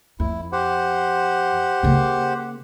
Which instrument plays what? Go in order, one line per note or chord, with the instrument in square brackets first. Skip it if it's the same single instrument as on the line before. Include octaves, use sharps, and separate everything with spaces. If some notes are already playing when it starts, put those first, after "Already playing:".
[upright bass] F2 [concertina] E4
[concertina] G4 C5 F#5
[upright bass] C#3 A#3